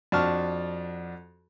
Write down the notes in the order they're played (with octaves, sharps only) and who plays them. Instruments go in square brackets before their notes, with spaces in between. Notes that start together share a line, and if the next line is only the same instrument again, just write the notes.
[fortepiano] F2 D4 F#4 A5 C#6 F6